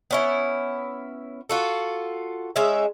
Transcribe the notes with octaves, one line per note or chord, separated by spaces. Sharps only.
B3 C#4 E4
F4 F#4 A4
G#3 C#4 D#4 E5